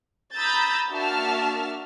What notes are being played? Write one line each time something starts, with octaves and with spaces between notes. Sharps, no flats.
A#5 B5 D#6 E6 G6 A6
A#3 D4 F#4 E5 A5 F6